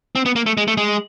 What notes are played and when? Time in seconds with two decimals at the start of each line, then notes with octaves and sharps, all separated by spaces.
0.15 C4
0.26 B3
0.36 A#3
0.46 A3
0.57 G#3
0.68 A3
0.77 G#3